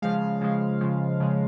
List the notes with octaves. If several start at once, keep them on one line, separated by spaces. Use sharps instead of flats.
C#3 F3 G#3 F5
C#3 F3 G#3
C#3 F3 G#3
C#3 F3 G#3